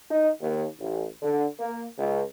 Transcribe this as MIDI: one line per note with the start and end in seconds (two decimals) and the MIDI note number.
0.11 0.29 63
0.41 0.65 39
0.79 1.05 33
1.22 1.46 50
1.60 1.84 58
1.98 2.22 37